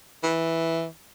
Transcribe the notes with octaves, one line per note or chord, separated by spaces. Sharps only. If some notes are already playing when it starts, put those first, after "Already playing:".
E3